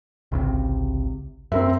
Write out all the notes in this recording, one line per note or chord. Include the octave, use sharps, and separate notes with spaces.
G#1 C#2 C3
F#2 C4 A#4 E5